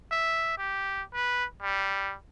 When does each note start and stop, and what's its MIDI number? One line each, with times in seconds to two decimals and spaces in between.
0.11 0.53 76
0.58 1.02 67
1.14 1.45 71
1.62 2.14 55